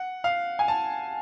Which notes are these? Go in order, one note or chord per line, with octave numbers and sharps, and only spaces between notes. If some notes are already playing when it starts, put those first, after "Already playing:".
Already playing: F#5
F5
G#5
A5